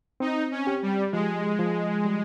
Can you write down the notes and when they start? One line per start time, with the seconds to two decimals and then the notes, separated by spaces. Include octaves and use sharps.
0.20 C4 D#4
0.52 C#4
0.67 G4
0.82 G3
1.12 F3 G#3
1.59 F3
2.05 G3